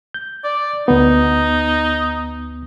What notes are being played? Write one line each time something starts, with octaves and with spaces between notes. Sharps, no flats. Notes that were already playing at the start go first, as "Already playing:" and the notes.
G6
D5
D2 B3 D#4